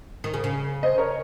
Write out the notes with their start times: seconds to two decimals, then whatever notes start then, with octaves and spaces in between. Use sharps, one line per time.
0.24 D#3
0.34 C#3
0.44 C#3
0.83 C5 D#5
0.98 A#4 C#5